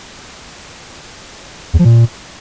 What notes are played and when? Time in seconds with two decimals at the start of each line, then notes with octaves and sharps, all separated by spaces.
1.73 E2
1.79 F3
1.85 A#2